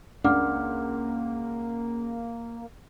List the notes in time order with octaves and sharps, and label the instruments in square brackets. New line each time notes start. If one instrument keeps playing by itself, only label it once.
[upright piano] C#2 [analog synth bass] A#3 [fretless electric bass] D4 [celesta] F#5 D6 F6